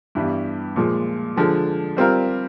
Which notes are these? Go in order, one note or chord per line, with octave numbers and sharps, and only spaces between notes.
G2 E3 G3 B3
A#2 F3 G#3
D3 F3 G#3
G3 C4 F4 A#4